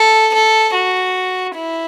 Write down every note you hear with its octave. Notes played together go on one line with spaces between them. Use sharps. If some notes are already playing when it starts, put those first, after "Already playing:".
Already playing: A4
A4
F#4
E4